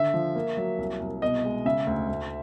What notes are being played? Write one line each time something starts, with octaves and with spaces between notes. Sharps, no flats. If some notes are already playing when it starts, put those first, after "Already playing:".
Already playing: D3 E5
F3
A#3
F#3
C2
C2
B2 D#5
G#3
C#3 E5
D2
D2